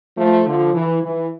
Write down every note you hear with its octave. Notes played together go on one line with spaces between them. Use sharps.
F3 A3
D3 F3
E3
E3